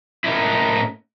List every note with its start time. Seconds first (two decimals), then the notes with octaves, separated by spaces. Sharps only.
0.24 A2 A#3 C#4 D#4 E4